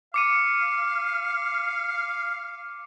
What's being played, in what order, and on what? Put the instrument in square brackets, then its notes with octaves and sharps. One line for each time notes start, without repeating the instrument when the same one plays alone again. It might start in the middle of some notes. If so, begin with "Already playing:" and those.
[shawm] F5 [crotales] D6 C#7 D#7